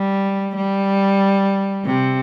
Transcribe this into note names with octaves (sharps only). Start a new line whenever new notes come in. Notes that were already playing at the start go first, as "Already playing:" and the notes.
Already playing: G3
G3
C3